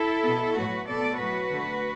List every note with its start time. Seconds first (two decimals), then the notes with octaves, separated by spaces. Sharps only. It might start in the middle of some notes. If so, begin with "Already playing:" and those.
Already playing: E4 A4
0.24 B2 B3
0.55 A2 F#3 A3 F#4 B4
0.88 B2 B3 A4 D5
1.19 A2 F#3 B3 F#4 B4
1.52 D3 A3